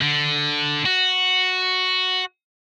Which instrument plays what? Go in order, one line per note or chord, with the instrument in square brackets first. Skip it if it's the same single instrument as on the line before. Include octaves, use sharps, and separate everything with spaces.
[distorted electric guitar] D3
F#4